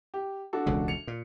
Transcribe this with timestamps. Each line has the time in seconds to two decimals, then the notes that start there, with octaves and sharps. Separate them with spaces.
0.14 G4
0.53 D4 F#4 A4
0.66 E1 C#2 C#3
0.88 C#7 F7
1.07 A#2